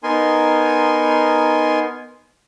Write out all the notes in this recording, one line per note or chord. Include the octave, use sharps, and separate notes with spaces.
B3 D#4 A#4 G#5 C6